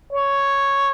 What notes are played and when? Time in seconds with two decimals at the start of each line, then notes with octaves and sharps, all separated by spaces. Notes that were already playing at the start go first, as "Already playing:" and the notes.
0.13 C#5